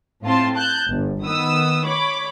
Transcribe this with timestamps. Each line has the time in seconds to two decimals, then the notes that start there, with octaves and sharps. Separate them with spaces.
0.23 A2 C4 F4 A5 C6
0.55 A5 F#6 G6
0.89 G1
1.23 D#3 B3 D#6 E6
1.86 C#5 B5 D6